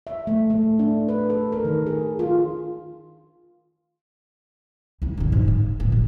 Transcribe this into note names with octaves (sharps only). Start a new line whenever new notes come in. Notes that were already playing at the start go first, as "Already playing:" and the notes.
E5
A3
A3
D4
B4
A4
A#4
D#3
G#4
F4
C2 E4
F#2 D3
G#2
C#3
A1 D2
A1